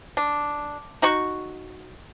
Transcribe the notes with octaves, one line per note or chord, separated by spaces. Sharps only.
D4
D#4 F#4 C#6